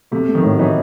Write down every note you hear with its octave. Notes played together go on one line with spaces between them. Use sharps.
C3 A3
A3
D#3
A2
F#3
E3 D#4